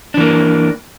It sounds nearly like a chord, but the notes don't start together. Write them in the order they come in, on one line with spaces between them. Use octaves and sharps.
D4 E3 A#3